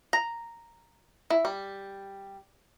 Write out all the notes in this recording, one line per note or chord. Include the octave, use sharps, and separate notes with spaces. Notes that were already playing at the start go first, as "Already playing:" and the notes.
A#5
E4
G3